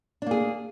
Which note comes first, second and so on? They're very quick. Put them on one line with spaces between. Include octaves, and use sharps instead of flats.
D4 A#3 G#4